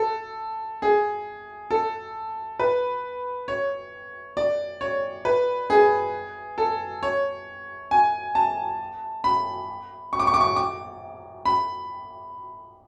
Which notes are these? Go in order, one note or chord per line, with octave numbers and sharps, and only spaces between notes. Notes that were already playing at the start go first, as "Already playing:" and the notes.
Already playing: A4
G#4
A4
B4
C#5
D5
C#5
B4
G#4
A4
C#5
G#5
A5
B5
C#6
D6
C#6
D6
C#6
D6
B5